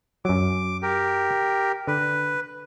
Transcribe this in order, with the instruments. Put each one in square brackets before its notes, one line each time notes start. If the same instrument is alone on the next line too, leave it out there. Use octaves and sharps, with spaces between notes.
[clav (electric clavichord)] F#2 F#3 [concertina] D6
[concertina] G4 A#4
[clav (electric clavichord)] D3 [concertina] B4